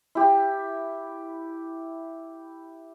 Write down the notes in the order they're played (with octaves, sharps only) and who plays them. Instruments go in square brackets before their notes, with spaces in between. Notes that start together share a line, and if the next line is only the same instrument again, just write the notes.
[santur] E4 G4